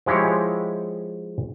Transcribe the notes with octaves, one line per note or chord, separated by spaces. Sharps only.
F3 G#3 E4 G4 C#5